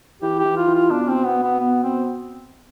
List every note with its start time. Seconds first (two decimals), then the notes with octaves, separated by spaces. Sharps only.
0.22 E3 G4
0.39 G4
0.45 E3
0.57 F4
0.68 E3
0.74 F4
0.91 B2 D4
1.08 C4
1.26 B3
1.43 B3
1.60 B3
1.83 C4